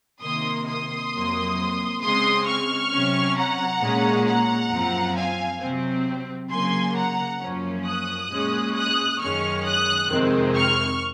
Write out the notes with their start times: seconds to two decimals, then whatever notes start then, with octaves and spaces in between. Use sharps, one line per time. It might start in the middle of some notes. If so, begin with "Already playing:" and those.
0.22 C3 D#3 A#3 C6 D#6
0.67 C6 D#6
1.12 F2 C3 F#3 A#3
2.01 C#3 G#3 C4 C6 D#6
2.46 C#6 F6
2.91 C3 F#3 C#4
3.37 F#5 A#5
3.81 A#2 G#3 C#4
4.26 F#5 A#5
4.71 F#2 F3 C4
5.16 F5 G#5
5.61 C3 F#3 C4
6.50 C#3 F#3 A#3 G#5 C6
6.96 F#5 A#5
7.40 F#2 F3 A#3 C#4
7.85 D#6 F#6
8.31 A#2 G#3 C#4
8.75 D#6 F#6
9.20 F#2 D#3 G#3 C#4 C#6 F6
9.65 D#6 F#6
10.10 F2 C3 D#3 G#3 C4
10.55 C#6 F6